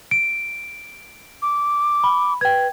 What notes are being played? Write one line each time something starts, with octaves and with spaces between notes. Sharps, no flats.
D7
D6
B5
B4 G5 G#6